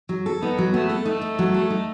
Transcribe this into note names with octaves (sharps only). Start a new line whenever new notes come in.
F#3
A4
B3 D#4
F#3
A3 B3
A4
A3 D#4
D#4
F#3
A4
D#4